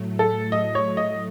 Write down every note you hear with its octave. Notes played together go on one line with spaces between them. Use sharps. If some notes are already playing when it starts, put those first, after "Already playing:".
Already playing: A2 F#3 A3
A4
D#5
C#5
D#5